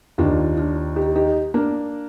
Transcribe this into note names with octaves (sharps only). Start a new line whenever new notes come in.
D#2 D#3 D4 F4
D4 F4
D#4 G4
D#4 G4
A#3 D4